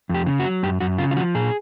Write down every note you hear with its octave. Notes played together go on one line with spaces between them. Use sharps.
F2
G4
C#3
F#4
F#3
F#2 G4
F#2 F#4
C#3 F4
F4
F3 F#4
A#2 G#4